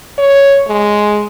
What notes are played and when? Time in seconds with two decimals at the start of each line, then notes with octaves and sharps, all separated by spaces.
0.18 C#5
0.68 G#3